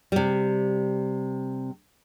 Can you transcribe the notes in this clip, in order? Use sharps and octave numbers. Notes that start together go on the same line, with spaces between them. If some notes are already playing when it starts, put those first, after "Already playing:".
C3 G3